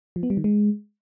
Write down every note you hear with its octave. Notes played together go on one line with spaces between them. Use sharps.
F3
B3
G3
D#3
G#3